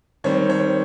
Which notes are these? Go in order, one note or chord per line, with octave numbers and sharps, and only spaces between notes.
D#3 G3 C4 C#5
C#5